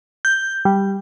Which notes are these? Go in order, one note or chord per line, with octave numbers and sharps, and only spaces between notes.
G6
G3